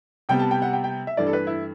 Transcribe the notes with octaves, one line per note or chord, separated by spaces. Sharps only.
C3 G3 B3 G5
A5
G5
F#5
G5
G5
E5
G2 E3 A3 D5
A4
B4
E4